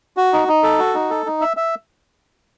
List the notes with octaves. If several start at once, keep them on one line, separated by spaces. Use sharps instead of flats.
F#4
D#4
D#4
A4
F#4
D#4
A4
D#4
E5
E5